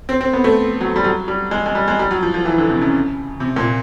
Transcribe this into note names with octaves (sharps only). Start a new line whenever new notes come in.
C4
C4
B3
A3
F#3
G3
F#3
G3
G#3
G#3
G3
G#3
G3
F#3
F3
F3
E3
D3
C3
C#3
C3
A#2